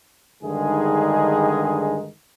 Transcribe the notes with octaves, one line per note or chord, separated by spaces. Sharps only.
G2 D3 D#3 G#3 D#4 G#4